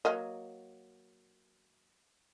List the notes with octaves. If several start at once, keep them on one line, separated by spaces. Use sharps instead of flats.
F#3 A#3 D#5